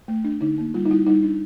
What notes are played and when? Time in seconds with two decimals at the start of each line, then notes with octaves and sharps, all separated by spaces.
0.08 A3
0.25 D4
0.41 D3 D#4
0.58 A#3
0.74 G3 F4
0.85 D#4
0.90 G3 E4
1.07 G3 D#4
1.23 D4